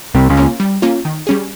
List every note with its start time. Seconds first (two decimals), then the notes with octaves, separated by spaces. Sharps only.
0.15 C2 C3 G3
0.30 C#2 C#3
0.37 A#3 C#4 F4
0.60 G3
0.82 A#3 C#4 F4
1.05 D#3
1.27 G3 C#4 G#4